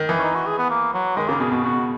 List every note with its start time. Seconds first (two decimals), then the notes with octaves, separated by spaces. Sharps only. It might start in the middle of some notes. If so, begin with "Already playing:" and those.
Already playing: D#3
0.09 E3
0.19 C#4
0.23 D#4
0.36 F#4
0.47 G#4
0.59 B3
0.70 A#3
0.94 F#3
1.16 D#3 G#3
1.28 C#3 A#3
1.40 B2 G#4
1.52 B2 F#4
1.63 B2 F#4